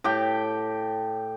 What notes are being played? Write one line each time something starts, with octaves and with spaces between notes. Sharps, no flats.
A2 G4 G5